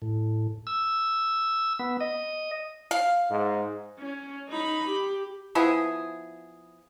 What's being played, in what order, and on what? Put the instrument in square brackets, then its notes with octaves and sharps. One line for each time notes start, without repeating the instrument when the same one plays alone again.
[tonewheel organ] A2
E6
B3
D#5
[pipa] F5
[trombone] G#2
[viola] C#4
D#4 B5
G4
[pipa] F3 B3 E4 G#4